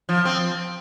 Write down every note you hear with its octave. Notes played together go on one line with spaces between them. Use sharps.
F3
C4